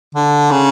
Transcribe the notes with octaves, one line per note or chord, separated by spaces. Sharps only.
D3
C#3